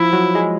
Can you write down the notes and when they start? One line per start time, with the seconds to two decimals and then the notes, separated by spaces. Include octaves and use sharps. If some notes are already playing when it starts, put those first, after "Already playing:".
Already playing: F3 E4
0.13 F#3
0.35 G#3